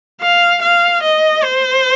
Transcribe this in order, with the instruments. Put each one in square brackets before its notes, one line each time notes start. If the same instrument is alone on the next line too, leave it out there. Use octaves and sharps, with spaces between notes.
[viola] F5
F5
D#5
C5